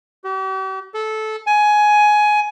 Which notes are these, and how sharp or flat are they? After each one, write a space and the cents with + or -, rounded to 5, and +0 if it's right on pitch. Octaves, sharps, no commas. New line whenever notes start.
G4 -45
A4 -15
G#5 +15